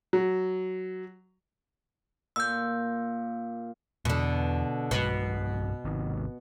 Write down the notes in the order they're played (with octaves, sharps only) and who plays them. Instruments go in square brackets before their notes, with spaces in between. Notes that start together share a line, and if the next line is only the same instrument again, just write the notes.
[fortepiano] F#3
[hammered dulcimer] A#2 [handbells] E6 G6
[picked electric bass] E2 [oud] B2 D3
[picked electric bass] B1 G2 G#3 [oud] B2
[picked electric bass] G#1 C3 D#3